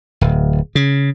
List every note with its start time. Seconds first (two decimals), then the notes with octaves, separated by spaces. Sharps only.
0.21 D1
0.75 C#3